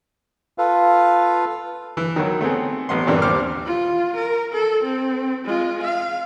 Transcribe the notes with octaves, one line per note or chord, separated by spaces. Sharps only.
F4 A4 B4 F5
E3
D#3 F#3
A3 B3 C4 G#4
A1 B3 C6
G2 A#2 E3 A#3 C4 D4
D#2 C5 D6 F6
F4
A#4
A4
C4
G#3 F4
F5